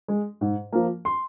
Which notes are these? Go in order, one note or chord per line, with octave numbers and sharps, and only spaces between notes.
G#3
G#2
F3 A#3
C6